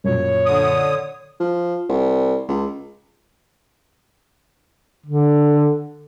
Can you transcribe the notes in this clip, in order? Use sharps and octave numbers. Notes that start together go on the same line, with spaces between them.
F#2 A#2 C#5
D3 D#6
F3
C2
C#2
D3